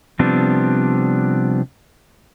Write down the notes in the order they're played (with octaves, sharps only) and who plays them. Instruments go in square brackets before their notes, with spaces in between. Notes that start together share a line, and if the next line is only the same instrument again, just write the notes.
[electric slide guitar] C3 F3 G3 B3 C4 D4